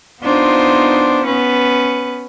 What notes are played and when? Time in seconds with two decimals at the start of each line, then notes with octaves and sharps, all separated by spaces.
0.23 B3 D4 D#4 F4 C5
1.26 B3 C#4 B4